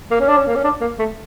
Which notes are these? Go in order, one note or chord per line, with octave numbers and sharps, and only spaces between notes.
A#3
C#4
D4
C#4
A#3
C#4
D4
A#3
A3